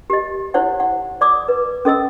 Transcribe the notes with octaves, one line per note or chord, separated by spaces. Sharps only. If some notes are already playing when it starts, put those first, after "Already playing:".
G4 D#5
E4 C5 C#5 F#5
F#5
D5 D6 D#6
B4
C#4 A4 D#5 E6